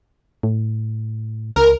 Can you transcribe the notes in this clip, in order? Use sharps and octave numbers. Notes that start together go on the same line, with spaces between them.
A2
C#2 A#4